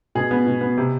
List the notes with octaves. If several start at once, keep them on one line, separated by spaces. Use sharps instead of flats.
B2 G#4
B3
B2
B3
C3